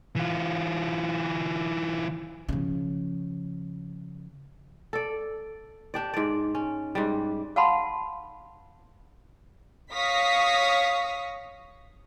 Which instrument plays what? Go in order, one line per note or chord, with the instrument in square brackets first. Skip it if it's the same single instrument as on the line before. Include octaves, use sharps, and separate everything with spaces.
[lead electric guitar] E3 F4
[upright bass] C#3 F3
[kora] A4 D5
D4 G4 D5
G#2 D5
C#4
G#2 G3
[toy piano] F5 F#5 A5 B5 C6
[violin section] C#5 F5 C#6 D#6 A#6 B6